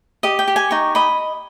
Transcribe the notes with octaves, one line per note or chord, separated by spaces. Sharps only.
G4 D#5
G5
G4
G#5
D#4 C#6
D#5 B5